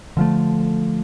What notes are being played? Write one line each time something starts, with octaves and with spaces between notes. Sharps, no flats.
D3 F3 A3